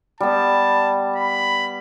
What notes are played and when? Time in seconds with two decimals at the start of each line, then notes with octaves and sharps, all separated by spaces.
0.20 G3 B3 A5
1.16 B5